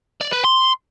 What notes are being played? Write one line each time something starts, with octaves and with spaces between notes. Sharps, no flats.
D5
B4
C6